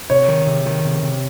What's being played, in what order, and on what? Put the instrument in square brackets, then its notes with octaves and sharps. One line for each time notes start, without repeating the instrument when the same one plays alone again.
[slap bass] C3 [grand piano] C#5
[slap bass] D#3
C3
D#3
C3
C3